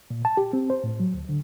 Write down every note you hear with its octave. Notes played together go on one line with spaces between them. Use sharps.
A#2
A5
G4
C4
C5
A2
F#3
D2
D3